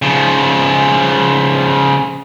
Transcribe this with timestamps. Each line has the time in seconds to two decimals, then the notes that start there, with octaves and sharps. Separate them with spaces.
0.02 C#3 F3